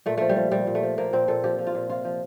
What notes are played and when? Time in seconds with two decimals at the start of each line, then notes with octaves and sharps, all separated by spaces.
0.06 A#2 A3
0.17 F3 A3
0.29 G3
0.37 F3
0.52 A#2 G3
0.67 A#2
0.75 A3
0.83 F3
0.98 F3 A#3
1.13 A#2 C4
1.28 A#2 A4
1.44 F3 G4
1.59 F3
1.67 F4
1.75 A#2
1.89 C3 F4
2.05 F3